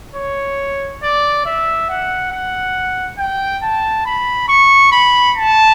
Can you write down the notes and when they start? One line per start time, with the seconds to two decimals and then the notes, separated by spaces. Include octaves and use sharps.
0.15 C#5
1.03 D5
1.46 E5
1.90 F#5
2.32 F#5
3.18 G5
3.62 A5
4.06 B5
4.48 C#6
4.92 B5
5.36 A5